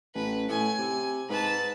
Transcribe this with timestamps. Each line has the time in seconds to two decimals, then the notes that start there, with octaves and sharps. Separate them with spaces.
0.15 A1 B4
0.49 A2 G#5
0.78 C3
1.29 G#2 B4 A5